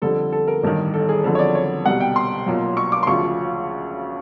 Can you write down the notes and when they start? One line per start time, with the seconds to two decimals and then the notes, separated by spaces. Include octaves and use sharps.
0.02 F2 D3 G3 A4
0.32 A4
0.48 A#4
0.63 A1 G2 D#3
0.94 A4
1.09 G#4
1.24 F2 D3 F#3 A4
1.35 C#5
1.39 D5
1.55 C#5
1.85 C2 B2 G3 F#5
2.00 G5
2.16 C6
2.46 B1 A#2 F#3
2.77 C#6
2.92 D6
3.03 C6
3.07 D2 C#3 F3 C#6